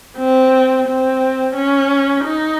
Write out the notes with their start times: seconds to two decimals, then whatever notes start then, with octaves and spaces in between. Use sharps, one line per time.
0.17 C4
0.87 C4
1.55 C#4
2.24 D#4